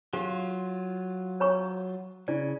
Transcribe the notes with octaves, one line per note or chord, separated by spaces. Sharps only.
F#3 F4 G4 F5
C#5 A#5 C#6
C#3 E4 D5